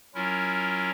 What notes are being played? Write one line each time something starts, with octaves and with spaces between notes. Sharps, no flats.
F#3 C#4 E4 F4 A#4